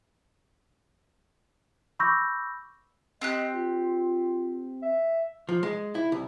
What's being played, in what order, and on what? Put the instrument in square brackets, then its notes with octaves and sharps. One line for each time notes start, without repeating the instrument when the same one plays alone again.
[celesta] B5 C#6 D6 E6 G6 A#6
[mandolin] C4 G4 F#6 [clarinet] D#5
[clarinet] F4
E5
[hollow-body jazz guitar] F3
G#3
E4
C2